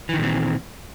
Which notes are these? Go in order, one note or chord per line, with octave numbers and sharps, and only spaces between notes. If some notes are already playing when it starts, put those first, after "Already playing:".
A#2 D#3 E3 C4